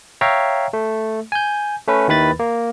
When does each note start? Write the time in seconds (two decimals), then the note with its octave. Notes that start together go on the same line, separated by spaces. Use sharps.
0.21 C#5 E5 F5 G5 A#5
0.73 A3
1.32 G#5 G6
1.88 A3 C#4 B4
2.08 D#2 D#3 E4 B4 B5 A6
2.39 A#3